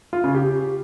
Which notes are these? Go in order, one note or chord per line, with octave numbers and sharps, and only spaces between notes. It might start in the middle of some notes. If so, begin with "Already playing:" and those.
F4
C#3
G4